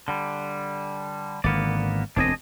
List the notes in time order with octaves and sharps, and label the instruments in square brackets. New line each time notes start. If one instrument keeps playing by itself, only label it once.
[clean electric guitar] D3 G3
[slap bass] G#1 D3 [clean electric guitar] A#3 B3 D5
[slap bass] E1 D2 C4 [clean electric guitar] D4 G#4 D#5